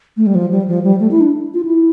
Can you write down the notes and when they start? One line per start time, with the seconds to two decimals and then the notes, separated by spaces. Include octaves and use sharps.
0.17 A3
0.26 G3
0.35 F3
0.51 G3
0.68 F3
0.84 G3
1.00 A3
1.11 E4
1.21 D4
1.54 F4
1.65 E4